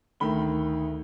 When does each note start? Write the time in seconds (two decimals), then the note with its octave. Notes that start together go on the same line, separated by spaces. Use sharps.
0.20 D2 D#3 B5 G7